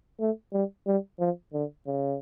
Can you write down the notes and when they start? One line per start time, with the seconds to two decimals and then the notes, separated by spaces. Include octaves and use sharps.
0.20 A3
0.53 G3
0.87 G3
1.20 F3
1.54 D3
1.87 C#3